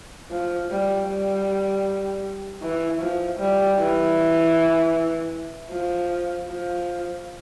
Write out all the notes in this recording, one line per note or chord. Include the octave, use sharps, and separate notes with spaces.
F3
G3
G3
E3
F3
G3
E3
F3
F3